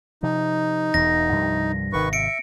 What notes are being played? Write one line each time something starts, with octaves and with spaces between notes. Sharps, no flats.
C3 F3 D#4
E1 E2 A#6
C2 G2 F3
G#1 C3 D#3 B4 C#6
E5 C#7 D7